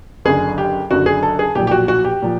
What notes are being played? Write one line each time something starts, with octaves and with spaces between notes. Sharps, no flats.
F#1 F#2 D3 G#4
G4
F#1 F#2 D3 F#4
G#4
A4
G#4
B1 A#2 F3 G4
G4
F#4
F#4
G4
A#2 F3